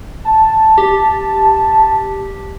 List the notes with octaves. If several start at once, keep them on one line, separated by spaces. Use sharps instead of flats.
A5
G4